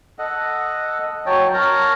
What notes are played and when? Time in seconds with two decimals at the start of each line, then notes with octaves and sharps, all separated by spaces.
0.19 A4 D#5 F#5
1.26 F#3 C#5 G5 A5
1.54 A#4 C#5 A5 A#5